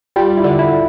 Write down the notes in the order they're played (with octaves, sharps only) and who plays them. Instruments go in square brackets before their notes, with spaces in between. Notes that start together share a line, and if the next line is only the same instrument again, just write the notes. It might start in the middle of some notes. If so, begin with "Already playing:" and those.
[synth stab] G3 [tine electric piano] F4
[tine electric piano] E4
[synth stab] D3
[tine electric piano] E4